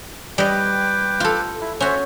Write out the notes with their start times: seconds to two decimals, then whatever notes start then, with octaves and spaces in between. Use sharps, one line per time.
0.38 G3 B4 D#5 G5 D6
1.20 F4 A4
1.61 E4
1.80 C#4 F#4 C5 C#5 E5